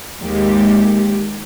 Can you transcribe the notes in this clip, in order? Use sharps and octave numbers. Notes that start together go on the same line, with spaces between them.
D#2 G#3 G4